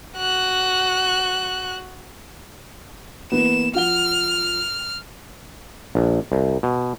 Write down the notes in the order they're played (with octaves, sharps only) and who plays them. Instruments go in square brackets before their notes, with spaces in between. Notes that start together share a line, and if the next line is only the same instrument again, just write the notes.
[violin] F#4 F#6
[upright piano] E3 A#3 B3 [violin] E7
[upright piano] F3 F#5 G7 [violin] F6
[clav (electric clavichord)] A#1
C2
B2